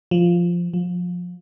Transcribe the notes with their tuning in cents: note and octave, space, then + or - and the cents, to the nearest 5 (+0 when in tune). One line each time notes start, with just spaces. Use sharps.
F3 -5
F3 +25